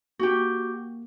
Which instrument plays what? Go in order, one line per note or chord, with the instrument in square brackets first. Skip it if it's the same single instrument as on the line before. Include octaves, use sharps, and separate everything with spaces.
[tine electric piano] A#3 [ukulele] F#4 G4